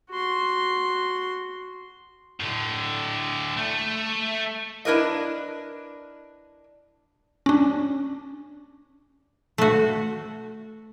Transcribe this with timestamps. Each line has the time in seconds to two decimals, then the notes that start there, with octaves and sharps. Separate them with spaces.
0.10 F#4 C6
2.40 A2 D3
3.57 A3
4.85 D4 E4 A#4 B4 D#5
7.46 C#4 D4
9.58 A3 F#4